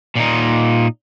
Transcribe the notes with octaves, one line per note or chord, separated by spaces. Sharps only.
A#2 D#4